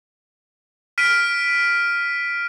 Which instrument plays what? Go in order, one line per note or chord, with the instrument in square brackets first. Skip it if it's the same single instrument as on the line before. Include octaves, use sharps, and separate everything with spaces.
[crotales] F6 B6 D7 D#7